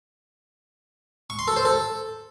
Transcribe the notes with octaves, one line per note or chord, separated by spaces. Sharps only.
C#6
C6
A4
C5
A4